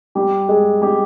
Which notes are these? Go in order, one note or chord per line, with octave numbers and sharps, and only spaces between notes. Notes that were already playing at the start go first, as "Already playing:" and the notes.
G3 G4
G#3 G#4
G3 G4